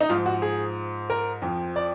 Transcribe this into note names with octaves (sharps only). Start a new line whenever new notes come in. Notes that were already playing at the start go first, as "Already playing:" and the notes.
D#4
G#2 F3 F4
F#4
G#4
A#4
F2 F3
D5